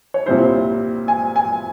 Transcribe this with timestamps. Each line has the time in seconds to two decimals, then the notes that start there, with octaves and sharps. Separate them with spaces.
0.14 C#5
0.26 C2 A#2 G3 C4 E4 C5
1.08 G#5
1.36 G#5